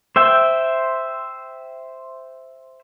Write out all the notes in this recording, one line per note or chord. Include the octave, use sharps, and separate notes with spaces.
C5 E5 G5